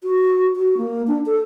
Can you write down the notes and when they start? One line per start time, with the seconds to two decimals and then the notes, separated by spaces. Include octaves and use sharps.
0.03 F#4
0.56 F#4
0.77 A#3
1.07 D4
1.26 A4